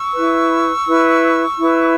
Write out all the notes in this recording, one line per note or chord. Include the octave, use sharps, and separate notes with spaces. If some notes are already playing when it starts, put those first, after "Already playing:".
Already playing: C#6 E6
E4 B4
E4 B4
E4 B4